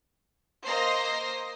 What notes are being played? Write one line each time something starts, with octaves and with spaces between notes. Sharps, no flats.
A#3 C5 D#5 A#5 A#6 C7